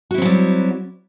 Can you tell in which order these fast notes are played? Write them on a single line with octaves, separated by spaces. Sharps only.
F#4 E4 C4 F#3 G3